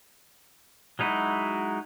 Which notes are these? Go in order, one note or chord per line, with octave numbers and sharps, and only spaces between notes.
F#3 G#3 D#4 E4 F#4